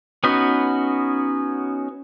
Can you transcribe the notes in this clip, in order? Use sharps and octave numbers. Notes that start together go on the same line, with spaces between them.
B3 C#4 D#4 F#4 B4